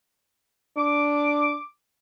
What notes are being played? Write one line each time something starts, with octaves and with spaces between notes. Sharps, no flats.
D4 D6